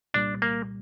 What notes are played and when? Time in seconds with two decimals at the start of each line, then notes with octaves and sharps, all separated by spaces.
0.14 C2 A#2 G3 D4
0.42 A#3